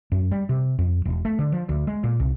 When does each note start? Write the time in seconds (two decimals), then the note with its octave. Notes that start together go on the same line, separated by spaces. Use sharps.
0.12 F#2
0.31 G3
0.49 C3
0.79 F2
1.05 E1
1.25 A3
1.39 D3
1.52 F3
1.69 D2
1.87 G#3
2.04 A#2
2.20 C2